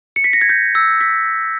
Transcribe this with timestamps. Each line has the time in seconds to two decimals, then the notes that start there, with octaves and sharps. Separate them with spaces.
0.16 C#7
0.24 B6
0.33 A#6
0.41 G#6
0.49 G6
0.75 E6
1.01 B6